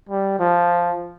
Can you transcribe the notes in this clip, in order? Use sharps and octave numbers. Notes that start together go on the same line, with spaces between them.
G3
F3